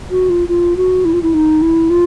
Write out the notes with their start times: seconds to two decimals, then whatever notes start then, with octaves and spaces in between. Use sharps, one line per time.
0.11 F#4
0.30 F4
0.49 F4
0.77 F#4
1.05 E4
1.13 F4
1.23 E4
1.34 D#4
1.62 E4
1.90 F4